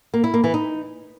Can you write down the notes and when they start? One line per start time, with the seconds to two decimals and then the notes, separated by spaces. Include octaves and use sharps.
0.14 A#3
0.24 E4
0.34 A#3
0.44 E3
0.54 D#4